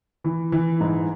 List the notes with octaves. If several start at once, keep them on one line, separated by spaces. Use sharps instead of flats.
E3
E3
G#2